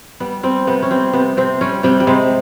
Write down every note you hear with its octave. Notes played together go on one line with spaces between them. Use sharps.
G3 B3
G3 C4
C3 B3
C#4
G3 C4
C3 B3
C3 C4
G3 C#4
C3 G3
G3
C3 G#3